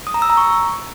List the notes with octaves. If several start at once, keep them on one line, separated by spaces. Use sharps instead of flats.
D#6
A#5
E6
A#5
C#6